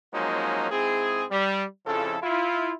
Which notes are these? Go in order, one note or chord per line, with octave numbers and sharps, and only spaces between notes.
F3 F#3 G#3 A#3 C#4 D#4
G#2 C4 E4 G#4
G3
F2 C#3 F3 E4 A4
E4 F4